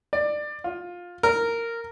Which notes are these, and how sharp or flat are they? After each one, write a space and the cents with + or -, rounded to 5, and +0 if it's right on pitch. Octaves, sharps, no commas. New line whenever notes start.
D5 +20
F4 +15
A#4 -10